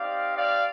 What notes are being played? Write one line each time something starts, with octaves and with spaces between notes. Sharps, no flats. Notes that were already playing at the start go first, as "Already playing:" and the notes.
Already playing: C4 D#4 G4 D5 F5
D5 F5